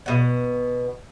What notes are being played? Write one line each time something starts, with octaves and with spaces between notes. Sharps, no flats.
B2 F#5